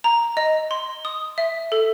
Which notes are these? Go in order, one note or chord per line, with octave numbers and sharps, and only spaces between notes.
A#5
D#5
C6
D#6
E5
A4